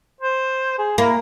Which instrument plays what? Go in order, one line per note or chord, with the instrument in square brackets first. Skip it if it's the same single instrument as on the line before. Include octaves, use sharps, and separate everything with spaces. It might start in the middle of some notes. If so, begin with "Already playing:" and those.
[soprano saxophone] C5
G#4
[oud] A#3 [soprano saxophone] E4